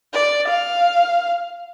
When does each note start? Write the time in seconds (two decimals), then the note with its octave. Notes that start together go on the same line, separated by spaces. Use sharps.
0.13 D5
0.48 F5